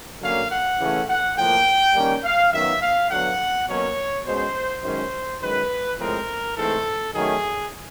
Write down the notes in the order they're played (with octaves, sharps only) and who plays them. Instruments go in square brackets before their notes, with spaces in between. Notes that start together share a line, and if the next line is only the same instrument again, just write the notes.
[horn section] D3 F#3 A#3 C#4 F5
F#5
C#3 E3 A3 C#4
F#5
A2 F3 A#3 G5
D#3 G3 A#3 C#4
F5
F#2 D#3 F#3 B3 E5
F5
D3 F#3 B3 F#5
B2 F#3 A#3 C#4 C#5
B2 G#3 C#4 C5
F#2 D#3 G#3 C#4 C5
F#2 D#3 G#3 B4
A2 F3 G#3 C4 A#4
G#2 E3 A3 C4 A4
D#3 F#3 A3 C#4 G#4